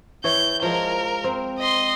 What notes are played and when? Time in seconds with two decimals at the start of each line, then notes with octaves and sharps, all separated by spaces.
0.24 E3 C#5 G6
0.62 F3 G#3 A#4
1.24 C4
1.58 D#5 C6